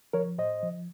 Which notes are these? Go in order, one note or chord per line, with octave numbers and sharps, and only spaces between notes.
F3 A#4 C#5
A2 C5 D#5
F3